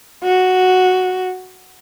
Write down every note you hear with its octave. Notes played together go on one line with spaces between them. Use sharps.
F#4